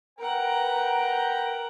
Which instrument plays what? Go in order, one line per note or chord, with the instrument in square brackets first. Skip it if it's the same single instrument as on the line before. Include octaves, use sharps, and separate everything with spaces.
[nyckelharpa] A#4 F#5 [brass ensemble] B4 G5 A#5